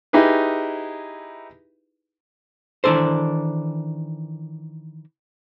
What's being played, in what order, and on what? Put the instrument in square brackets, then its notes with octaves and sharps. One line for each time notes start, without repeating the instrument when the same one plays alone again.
[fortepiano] D#4 E4 G4 G#4 B4
[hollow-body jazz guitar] D#3 E3 D4 A4 C5